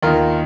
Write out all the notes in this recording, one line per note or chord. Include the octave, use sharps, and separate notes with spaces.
D#2 D#3 F4 A#4